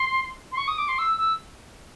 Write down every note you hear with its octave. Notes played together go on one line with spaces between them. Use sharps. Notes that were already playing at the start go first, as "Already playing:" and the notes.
Already playing: C6
C6
C#6
D#6
D6
C6
E6
E6